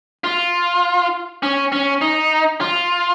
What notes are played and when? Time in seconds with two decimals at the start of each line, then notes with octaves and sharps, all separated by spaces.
0.24 F4
1.43 C#4
1.72 C#4
2.01 D#4
2.61 F4